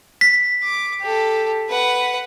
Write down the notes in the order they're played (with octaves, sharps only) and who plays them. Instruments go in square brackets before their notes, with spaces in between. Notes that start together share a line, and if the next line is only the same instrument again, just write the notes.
[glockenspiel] B6
[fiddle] D6
G4 A4
B4 F#5